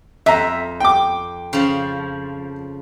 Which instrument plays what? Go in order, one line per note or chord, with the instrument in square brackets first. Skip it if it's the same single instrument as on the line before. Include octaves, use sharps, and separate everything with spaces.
[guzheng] F2 [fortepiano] E5 A#5
[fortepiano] G5 D6
[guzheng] C#3 F3